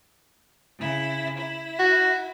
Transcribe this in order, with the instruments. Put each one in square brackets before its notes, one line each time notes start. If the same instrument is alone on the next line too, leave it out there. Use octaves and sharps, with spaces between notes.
[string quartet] C#3 E4
E4
[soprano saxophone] F#4